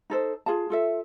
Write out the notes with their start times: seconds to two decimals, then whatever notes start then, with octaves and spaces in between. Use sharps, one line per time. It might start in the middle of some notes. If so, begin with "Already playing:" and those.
0.10 D#4 A4 C5
0.46 F4 G#4 F5 A5
0.70 F4 A4 E5